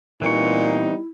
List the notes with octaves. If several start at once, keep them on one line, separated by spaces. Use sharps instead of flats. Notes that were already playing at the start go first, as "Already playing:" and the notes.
A#2 E3 G3 B3 C4 D#4 E4 C#6